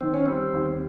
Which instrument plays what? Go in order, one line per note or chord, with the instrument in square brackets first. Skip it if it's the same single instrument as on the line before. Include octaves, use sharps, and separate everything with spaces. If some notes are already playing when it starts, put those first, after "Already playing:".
[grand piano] D#3 [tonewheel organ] C4
[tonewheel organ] C#4
[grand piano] G3 [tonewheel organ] C4
[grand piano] D#2